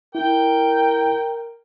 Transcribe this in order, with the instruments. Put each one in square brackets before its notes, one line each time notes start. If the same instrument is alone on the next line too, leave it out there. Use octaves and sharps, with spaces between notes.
[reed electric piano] E4 [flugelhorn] A#4 [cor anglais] G5